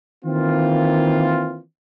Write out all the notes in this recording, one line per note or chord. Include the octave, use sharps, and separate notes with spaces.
D#3 E3 A#3 C4 F4